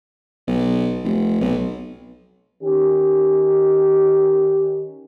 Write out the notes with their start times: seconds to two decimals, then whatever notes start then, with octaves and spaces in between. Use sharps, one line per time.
0.48 B1
1.04 F1
1.41 B1
2.63 D#3 C#4 G4